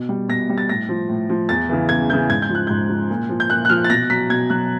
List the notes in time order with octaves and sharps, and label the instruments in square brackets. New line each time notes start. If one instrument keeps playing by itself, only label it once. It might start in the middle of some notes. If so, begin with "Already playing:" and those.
Already playing: [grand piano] B2
G3
B2 A#6
G3
A6
A2 A#6
F3
A2
F3
E2 A6
C#3 E3
E2 G#6
C#3 E3 G6
G#2 G#6
G6
F3
F#6
G#2 G6
F3
A#2
F3
G6
A#2 F#6
F#6
F3 F6
A6
B2 A#6
F#3 B6
B2 G#6
F#3 F#6